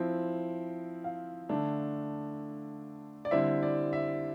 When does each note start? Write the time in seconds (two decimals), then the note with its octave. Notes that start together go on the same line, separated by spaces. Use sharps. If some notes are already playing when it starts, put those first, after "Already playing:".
Already playing: F3 C4 E4
1.04 F5
1.49 D3 A3 D4
3.25 D5
3.31 D3 G3 C4 E4 E5
3.63 D5
3.93 E5